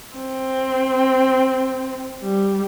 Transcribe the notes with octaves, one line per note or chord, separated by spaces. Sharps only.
C4
G3